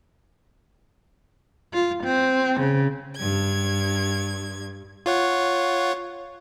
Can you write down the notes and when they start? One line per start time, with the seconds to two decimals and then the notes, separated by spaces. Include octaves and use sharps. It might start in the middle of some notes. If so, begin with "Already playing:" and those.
1.73 F4
2.02 C4
2.59 C#3
3.16 G2 G#6
5.06 F4 C#5 F#5